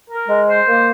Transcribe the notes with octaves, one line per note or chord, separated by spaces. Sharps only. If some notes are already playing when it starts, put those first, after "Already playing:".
A#4
G#3
C5
A#3